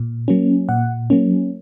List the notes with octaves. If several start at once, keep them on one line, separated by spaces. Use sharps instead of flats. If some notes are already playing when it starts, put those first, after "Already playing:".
Already playing: A#2
F#3 A#3 C#4
A#2 F#5
F#3 A#3 C#4